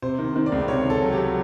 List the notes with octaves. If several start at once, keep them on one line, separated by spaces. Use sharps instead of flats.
C3 C5
D#3
D#3
D5
C#2
C3 C#5
D#3
A4
F#3
G4
F#3